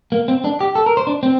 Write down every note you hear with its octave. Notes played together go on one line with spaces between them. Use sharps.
A#3
C4
D4
G4
A4
A#4
C5
D4
C4